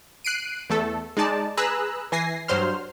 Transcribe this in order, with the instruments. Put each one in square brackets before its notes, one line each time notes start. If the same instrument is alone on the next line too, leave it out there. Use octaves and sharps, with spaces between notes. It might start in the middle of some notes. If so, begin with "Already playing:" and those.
[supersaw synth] F#6 C7 D7 D#7
E2 A3 A4
G#3 D#4 D5 A5
G#4 B4 A#5 E6 F#6
E3 G#5 A#6 C7
G2 F#3 C5 C6 F6